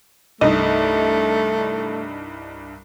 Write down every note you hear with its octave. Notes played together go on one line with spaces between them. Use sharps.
C2 G2 A3 D#4 D#5